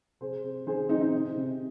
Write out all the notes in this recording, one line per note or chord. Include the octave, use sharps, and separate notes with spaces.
C3 G#4 C5
C3
D#3 G#4 C5
D#3 C4 D#4
C4 D#4
C3
C3